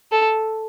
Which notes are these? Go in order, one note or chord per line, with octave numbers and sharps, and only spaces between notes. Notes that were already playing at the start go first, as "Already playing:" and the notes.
A4